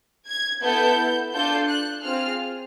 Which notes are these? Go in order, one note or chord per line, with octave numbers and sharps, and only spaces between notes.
G#6
B3 E4 A4 G6
D4 F4 A4 G6
F#6
C4 F4 G#4 F6